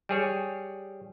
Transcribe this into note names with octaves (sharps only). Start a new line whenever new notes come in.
G3 G#4 C#5